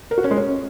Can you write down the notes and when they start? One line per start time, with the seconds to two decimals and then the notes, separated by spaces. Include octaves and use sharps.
0.11 A#4
0.18 F#4
0.24 C#4
0.31 G#3
0.37 C#4